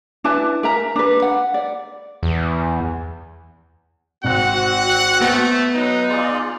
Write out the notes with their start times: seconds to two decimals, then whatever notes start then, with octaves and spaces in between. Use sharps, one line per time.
0.24 D4 E4 B4 A5
0.63 A#4 E5 A#5
0.96 D4 B4
1.22 F#5
1.54 D5
2.23 E2
4.24 G#1 C4 F#4 F#5 F#6
5.21 A3 B3 A#6
5.74 F#3 D#4 B4
6.08 F4 G#4 D5